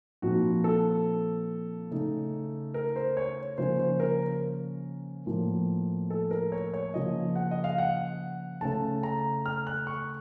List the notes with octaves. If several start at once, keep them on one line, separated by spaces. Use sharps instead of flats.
A#2 F3 C4 D#4 F#4
A4
C#3 A3 D#4
A#4
C5
C#5
C#3 F3 A#3 C#4 C5
C5
A#4
A2 F3 A#3
A4
A#4
C#5
C#5
C#3 F3 A#3 D#5
F#5
D#5
F5
F#5
C#3 A3 C#4 A5
A#5
F6
F#6
C#6